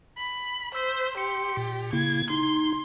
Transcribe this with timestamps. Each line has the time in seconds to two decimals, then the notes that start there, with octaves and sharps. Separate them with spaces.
0.17 B5
0.75 C5 E6 B6
1.17 G4 C6 C#7
1.57 A#2
1.93 C#3 A#3 E4 G#6
2.30 D#4 C6